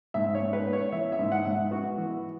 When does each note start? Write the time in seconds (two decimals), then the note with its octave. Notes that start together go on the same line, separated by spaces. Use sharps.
0.14 G#2 E5
0.35 C#5
0.40 G#2
0.53 B4
0.67 B3
0.73 C#5
0.92 E3 E5
1.12 E5
1.19 G#2
1.32 F#5
1.46 G#2
1.51 E5
1.71 B3 F#4
1.98 E3